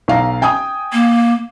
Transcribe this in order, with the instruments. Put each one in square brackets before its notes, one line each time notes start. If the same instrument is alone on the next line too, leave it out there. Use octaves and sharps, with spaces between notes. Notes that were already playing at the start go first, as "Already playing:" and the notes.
[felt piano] B1 F5 A#5
G5 G#5 D#6
[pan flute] A#3